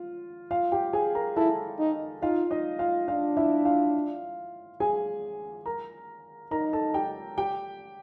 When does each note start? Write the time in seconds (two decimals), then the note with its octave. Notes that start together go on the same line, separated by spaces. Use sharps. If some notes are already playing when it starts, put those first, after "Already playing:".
Already playing: F4
0.51 F4 F5
0.72 G4 G5
0.93 G#4 G#5
1.15 A#4 A#5
1.36 E4 A4 A5
1.79 D#4
2.22 D#4 F4 F5
2.51 D#4 D#5
2.79 F4 F5
3.08 D4 F4 F5
3.37 E4 E5
3.65 F4 F5
4.80 G#4 G#5
5.66 A#4 A#5
6.51 D#4 A#4 A#5
6.73 A4 A5
6.94 G4 G5
7.38 G4 G5